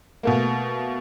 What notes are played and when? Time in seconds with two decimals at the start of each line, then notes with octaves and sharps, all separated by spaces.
0.23 B2 A3 A#3